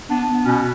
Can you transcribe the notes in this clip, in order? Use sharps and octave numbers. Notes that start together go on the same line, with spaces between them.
B3 D4
B3
B2 C#4